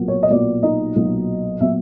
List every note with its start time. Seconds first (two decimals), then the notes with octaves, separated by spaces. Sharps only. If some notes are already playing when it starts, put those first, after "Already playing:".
Already playing: B1 A#2 F#3 B3
0.08 C#5
0.23 D#5
0.30 B1 A#2 F#3 B3 D5
0.63 D#4 D#5
0.96 B1 A#2 F#3 B3
1.60 A#2 F#3 B3 E5